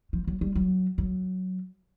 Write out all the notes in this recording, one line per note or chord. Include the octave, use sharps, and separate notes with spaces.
F3
F#3
G3
F#3
F#3